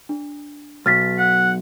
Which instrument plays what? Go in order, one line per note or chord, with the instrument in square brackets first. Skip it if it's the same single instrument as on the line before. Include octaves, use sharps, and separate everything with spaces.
[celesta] D4
[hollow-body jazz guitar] B1 [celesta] F6 A6 B6
[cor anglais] F#5